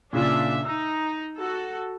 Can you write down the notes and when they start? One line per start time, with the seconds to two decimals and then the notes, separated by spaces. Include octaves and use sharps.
0.13 A#2 C#3 D4 F4 E5
0.65 D#4 E6
1.37 F#4 A4